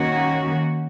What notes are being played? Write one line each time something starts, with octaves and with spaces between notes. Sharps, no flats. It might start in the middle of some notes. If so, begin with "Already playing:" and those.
Already playing: D#3 A#3 C#4 F#4